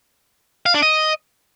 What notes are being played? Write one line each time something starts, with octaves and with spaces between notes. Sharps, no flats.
F5
D4
D#5